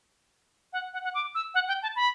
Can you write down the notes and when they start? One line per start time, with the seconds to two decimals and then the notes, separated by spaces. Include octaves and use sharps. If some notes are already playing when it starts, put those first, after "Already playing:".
0.73 F#5
0.93 F#5
1.04 F#5
1.14 D6
1.35 E6
1.54 F#5
1.68 G5
1.83 A5
1.96 B5